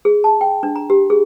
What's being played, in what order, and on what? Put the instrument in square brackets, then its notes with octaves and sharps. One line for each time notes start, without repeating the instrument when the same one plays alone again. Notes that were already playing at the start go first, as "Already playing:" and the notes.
[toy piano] G#4
A5
G5
D4
A#5
G4
G#4